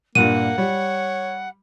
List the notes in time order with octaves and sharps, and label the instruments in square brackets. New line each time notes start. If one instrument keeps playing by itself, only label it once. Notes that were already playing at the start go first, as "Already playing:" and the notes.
[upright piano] G2 A#2 [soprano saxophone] A#3 [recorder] F#5 [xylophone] D#7
[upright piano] G3 [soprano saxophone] C#5